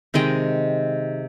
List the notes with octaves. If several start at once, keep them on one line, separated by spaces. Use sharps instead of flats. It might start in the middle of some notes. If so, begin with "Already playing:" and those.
C3 D#3 G#3 C4 D#5 G5